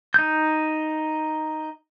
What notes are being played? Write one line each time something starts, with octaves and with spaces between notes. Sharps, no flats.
D#4 G6